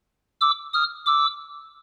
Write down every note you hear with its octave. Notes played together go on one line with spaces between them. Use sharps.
D6 E6
D#6 F6
D6 E6